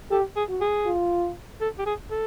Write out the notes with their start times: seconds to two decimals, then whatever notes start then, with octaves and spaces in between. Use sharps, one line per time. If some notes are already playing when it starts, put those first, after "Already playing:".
0.11 G4 A4
0.36 G#4
0.49 F#4
0.61 G#4
0.85 F4
1.61 A4
1.79 G4
1.86 G#4
2.11 A4